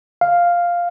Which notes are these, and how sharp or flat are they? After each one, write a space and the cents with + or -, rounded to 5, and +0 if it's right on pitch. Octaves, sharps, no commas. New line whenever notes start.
F5 +0